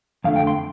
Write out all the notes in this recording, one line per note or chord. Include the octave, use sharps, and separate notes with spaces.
F2 D3 A3 F5
G5
C6